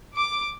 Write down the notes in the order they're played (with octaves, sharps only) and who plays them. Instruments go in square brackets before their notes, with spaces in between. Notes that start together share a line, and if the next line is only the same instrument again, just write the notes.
[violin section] D6